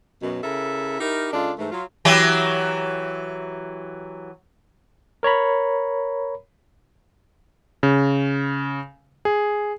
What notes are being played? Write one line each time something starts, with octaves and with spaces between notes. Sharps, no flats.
F#2 B2
C#3 E4 A4 A#4 E5
D#4 E4 G4 A#4
C#3 G#3 D4 F4 A4
G#2 E3 A3
F#3 F4
E3 F#3 G4
A#4 C#5 A#5 B5
C#3
G#4